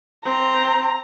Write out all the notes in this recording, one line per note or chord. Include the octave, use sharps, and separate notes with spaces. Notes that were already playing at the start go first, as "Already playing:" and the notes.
C4 A#5